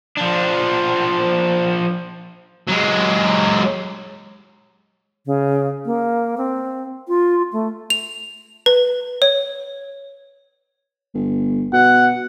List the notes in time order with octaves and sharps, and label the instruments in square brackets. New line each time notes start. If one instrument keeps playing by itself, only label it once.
[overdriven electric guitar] F3 D4
[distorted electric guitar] F#3 G#3
[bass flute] C#3
A#3
C4
F4
A3
[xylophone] F7
B4
C#5
[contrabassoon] G1
[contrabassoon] B2 [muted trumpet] F#5